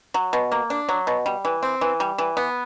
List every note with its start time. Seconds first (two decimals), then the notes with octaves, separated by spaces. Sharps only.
0.14 F#3
0.33 B2
0.52 A#3
0.70 D4
0.89 F#3
1.07 B2
1.26 G3
1.45 E3
1.63 C4
1.81 E3
2.00 G3
2.18 E3
2.37 B3